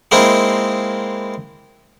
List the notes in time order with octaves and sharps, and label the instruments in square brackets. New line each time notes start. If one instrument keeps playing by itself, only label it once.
[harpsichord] G#3 A#3 C4 D#4 E4